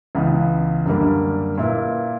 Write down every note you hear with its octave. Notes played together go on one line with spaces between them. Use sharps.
C#2 C#3 E3 B3
F#2 D3 G3 A#3 D4
A#2 A#3 E4 B4